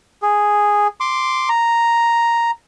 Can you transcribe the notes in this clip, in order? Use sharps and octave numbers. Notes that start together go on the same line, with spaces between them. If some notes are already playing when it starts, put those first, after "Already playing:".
G#4
C6 D6
A#5